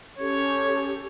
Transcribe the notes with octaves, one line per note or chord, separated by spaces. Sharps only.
C#4 G4 A4 C#5